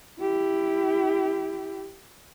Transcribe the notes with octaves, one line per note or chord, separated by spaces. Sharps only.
E4 G4